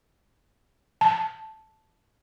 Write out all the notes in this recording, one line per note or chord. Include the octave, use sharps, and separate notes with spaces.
A5